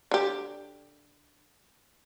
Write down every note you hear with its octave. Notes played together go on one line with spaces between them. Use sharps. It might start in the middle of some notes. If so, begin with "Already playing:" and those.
D3 G4